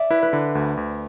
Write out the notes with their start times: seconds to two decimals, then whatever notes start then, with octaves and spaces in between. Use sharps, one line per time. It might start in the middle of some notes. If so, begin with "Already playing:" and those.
Already playing: D5 E5
0.11 E4 B4
0.22 B4
0.33 D3
0.55 D2
0.77 D2